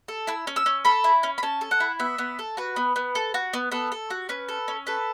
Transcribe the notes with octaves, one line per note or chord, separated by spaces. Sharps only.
A4
E4 E6
C#4
E6
C#4
A4 B5
E4
C#4
B5
C#4 A5
A4
F#5
E4
B3 E5
B3
A4
F#4 B4
B3
B3
A4
F#4
B3
B3 A4
A4
F#4
C#4 B4
A4
C#4
A4 B4